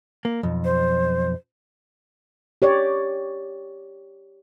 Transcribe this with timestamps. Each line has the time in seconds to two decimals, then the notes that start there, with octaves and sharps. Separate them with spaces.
0.25 A#3
0.43 B1 F2
0.65 C5
2.62 G4 C#5 D5